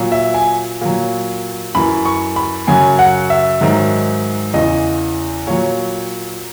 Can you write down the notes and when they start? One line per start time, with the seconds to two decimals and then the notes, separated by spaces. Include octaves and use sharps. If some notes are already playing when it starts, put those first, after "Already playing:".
Already playing: A#2 F#3
0.12 E5
0.34 G#5
0.81 A#2 F#3
1.75 F#2 E3 B5
2.05 C#6
2.36 B5
2.67 F#2 C#3 F#3 G#5
2.99 F#5
3.30 E5
3.61 G#2 D#3 F#3
4.54 E2 C#3 E3 D#5
5.47 A#2 F#3 C#5